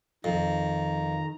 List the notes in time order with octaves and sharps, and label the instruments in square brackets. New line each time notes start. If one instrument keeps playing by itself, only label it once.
[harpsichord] F2 [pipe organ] D#3 A#5